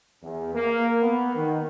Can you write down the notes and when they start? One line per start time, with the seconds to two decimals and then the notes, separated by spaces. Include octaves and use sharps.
0.23 E2
0.54 A#3
1.02 B3
1.34 D#3